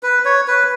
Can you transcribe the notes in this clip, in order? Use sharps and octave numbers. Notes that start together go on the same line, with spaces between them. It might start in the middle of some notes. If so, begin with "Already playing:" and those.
B4
C#5
B4